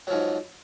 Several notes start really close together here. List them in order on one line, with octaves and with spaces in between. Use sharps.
F#3 F3 G#2